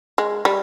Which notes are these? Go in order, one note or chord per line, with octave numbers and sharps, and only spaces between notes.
G#3
G3